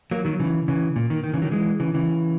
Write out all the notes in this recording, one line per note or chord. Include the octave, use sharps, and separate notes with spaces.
F#3 A#3
D#3 F#3
C#3 E3
C#3 E3
A#2
D#3
D#3
C#3 E3
D#3 F#3
E3 G#3
C#3 E3
C#3 E3